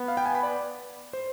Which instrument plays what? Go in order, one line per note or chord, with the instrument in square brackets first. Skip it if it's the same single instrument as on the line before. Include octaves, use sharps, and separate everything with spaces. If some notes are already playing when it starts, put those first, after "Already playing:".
Already playing: [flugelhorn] B3
[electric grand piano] F5
G5
G#5
B5
D5
C5